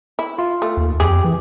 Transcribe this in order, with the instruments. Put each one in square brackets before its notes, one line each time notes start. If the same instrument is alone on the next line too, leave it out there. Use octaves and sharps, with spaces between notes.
[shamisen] E4
[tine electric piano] F4
[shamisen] A3
[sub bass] D#2
[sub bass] F2 [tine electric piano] G4 [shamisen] G#4
[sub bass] E3